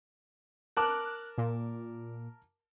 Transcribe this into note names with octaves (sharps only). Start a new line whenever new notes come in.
A#4 A5 D6 F#6
A#2